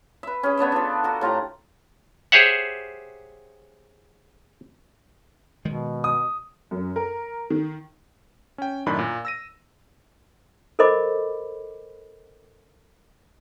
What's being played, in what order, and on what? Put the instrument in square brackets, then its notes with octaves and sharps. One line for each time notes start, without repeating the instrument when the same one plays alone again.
[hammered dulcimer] B4 E5
C#4 G#4
B3 D4 C#5 E5
D4 F4 A4
F#4 A4 A#4
A2 F4 G4 A#5
[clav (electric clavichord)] G4 G#4 C5 C#5 E5 F#5
[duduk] B2 [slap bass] D#3 G#3
[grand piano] D#6
[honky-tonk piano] F#2
A#4
D#3
[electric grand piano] C#4 G5
F#2 A2 D#3 D4 B5
A#2 A#3
E6 A#6 D#7
[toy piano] A4 A#4 C5 D#5 B5 D6